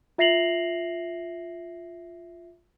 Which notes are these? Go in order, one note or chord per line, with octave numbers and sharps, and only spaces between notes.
F4 E5 A#6 C7 F7 F#7